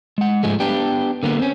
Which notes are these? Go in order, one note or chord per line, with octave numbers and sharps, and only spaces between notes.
G#3 F#5
G#2 F3 G#3 A3
B3 D4 G4
D3 A#3 B3
C4 C#4